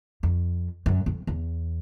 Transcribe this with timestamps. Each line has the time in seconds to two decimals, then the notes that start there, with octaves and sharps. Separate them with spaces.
0.23 F2
0.86 F#2
1.06 F2
1.27 E2